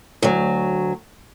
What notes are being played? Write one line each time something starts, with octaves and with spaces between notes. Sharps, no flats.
D2 F#3